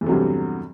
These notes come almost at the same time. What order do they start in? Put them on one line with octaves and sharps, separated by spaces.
E2 A3 C3 F#3 G2